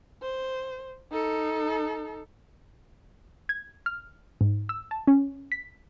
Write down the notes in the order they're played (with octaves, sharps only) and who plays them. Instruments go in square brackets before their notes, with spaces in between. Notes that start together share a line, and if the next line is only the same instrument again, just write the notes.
[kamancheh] C5
D#4 A4
[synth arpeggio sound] G#6
F6
G#2
E6
A5
C#4
B6